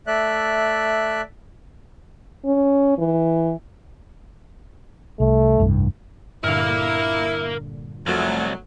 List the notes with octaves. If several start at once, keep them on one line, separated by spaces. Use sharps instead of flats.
A3 D5 E5 F#6
C#4
E3
C2 A3
F1 C2 G2
G2 A#2 D3 E4 A#4 F5
C2 F2 F#3 A3